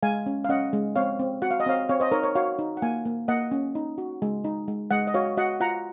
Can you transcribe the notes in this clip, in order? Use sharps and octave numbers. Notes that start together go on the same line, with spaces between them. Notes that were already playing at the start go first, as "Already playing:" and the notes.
G#3 F5 G#5
C#4
F5
C#4 D#5 F#5
G#3
C4 C#5 F5
C4
F#4 F#5
F5
D#5
C4 C#5 F5
C4 C#5 F5
C5 D#5
D#4 A#4 C#5
A#4 C#5
F#4 C#5 F5
D#4
F#5
A#3 F5 G#5
A#3
A#3 D#5 F#5
C#4
D#4
F#4
G#3
D#4
G#3
G#3 D#5 F#5
D#5
F#4 C#5 F5
F#4 D#5 F#5
F4 F#5 A#5